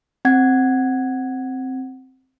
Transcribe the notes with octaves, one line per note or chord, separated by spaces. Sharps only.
C4 F#5 G#6